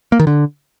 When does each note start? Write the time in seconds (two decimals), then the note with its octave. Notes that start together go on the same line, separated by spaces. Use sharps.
0.12 A#3
0.20 D#3
0.27 D3